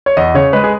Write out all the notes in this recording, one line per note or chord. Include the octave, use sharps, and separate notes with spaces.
C#5
E2 D#5
C#3 C#5
G#3 B4
G#4